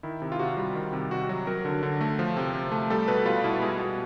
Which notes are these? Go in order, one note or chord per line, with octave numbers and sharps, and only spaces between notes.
D#3 E4
C3
F4
C3 F#4
G3
D#3
C3
C3 F#4
F#3
F#3 A#4
D3
D3
A3
F3
C3
C3
A3
G3 A4
B2 B4
G3 F4
B2 E4
G#3 G#4
B2